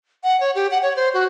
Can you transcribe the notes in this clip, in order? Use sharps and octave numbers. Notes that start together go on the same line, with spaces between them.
F#5
C#5
G4
F#5
C#5
C5
F#4